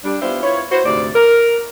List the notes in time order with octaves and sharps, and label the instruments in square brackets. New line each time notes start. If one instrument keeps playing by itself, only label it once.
[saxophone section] G3 D4
B3 D4 E4 F4 G4 C5
E4 F4 B4 C#5
E4 F#4 B4 C5
D2 G#2 C3 D5
A#4